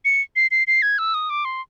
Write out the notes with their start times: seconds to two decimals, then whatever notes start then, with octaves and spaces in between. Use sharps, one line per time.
0.05 C#7
0.36 C7
0.51 C7
0.67 C7
0.82 G#6
0.98 E6
1.14 D#6
1.30 D6
1.45 C6